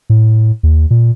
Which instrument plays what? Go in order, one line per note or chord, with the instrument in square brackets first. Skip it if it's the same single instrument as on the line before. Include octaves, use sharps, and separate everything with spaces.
[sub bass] A2
D#2
A#2